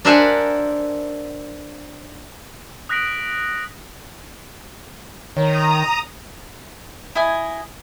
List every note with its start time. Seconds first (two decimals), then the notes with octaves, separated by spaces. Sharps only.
0.05 D4 A#4 C5 E5 F#5 G#5
2.89 D#6 F#6 A#6 B6 D7 F#7
5.37 D#3 C#5 A#5 D#6
7.15 E4 D#5 G#5